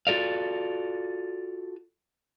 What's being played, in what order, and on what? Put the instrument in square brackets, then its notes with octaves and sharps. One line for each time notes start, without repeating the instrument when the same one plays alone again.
[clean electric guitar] F4 F#4 A4 D5 F5